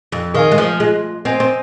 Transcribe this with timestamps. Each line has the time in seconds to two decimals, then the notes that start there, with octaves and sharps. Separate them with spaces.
0.12 F2
0.34 D#3 G#4 F5 G#5
0.51 G#3
0.58 F3
0.80 G#3 F4
1.25 C4 C5 D#5 G#5
1.40 C4